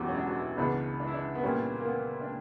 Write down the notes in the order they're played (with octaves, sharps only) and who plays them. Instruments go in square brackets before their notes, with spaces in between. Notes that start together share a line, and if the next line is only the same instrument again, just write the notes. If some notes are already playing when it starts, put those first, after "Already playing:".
Already playing: [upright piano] E1 E2 B2 F#3 B3 [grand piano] E4 F#4 G4
[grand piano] C#4
D4
F#4
E4
[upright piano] C#2 C#3 E3 B3 [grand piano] D4
[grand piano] D4
E4
D4
B3
[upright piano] A#2 G3 A#3 [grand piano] C#4
[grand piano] A#3
B3
D4